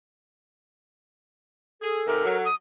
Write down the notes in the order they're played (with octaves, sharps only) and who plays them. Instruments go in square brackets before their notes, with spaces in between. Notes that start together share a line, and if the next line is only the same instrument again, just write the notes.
[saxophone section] G#4 [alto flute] A4
[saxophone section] G#2 C3 [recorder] A#4
[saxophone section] F#3
[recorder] D#6